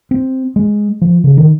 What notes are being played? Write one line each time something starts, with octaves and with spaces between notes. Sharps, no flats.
C4
G#3
F3
C#3
D#3